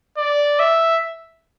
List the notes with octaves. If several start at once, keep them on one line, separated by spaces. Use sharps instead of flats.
D5
E5